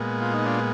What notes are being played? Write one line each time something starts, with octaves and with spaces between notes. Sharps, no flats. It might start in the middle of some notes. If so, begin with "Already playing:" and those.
Already playing: A#2 G#3 B3
F4
D#4
D4 F4